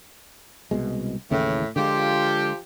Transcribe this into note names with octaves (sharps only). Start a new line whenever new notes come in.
C2 B2 G#3
D#2 A2 C#3 E3
D3 F3 G#3 F4 G4